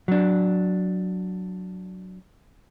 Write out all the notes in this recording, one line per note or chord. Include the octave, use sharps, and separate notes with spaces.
F#3 D4